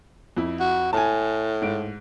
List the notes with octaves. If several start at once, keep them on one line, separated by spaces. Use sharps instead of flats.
F2 E4
F#4
A2 G#5 A5
G#2 D7